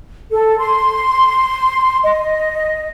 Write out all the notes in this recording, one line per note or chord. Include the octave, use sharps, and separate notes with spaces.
A4
C6
D#5